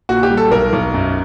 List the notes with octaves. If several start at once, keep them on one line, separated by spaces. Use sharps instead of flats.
A#2 F#4
G4
G3
A4
B1 A#4
B1
F#2